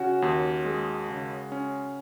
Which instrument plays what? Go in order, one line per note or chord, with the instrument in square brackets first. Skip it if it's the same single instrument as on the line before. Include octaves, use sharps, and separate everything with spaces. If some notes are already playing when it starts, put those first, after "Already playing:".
Already playing: [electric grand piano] C#3 C#4 [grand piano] F#4
[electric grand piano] D#2
G#3
C#3
C#4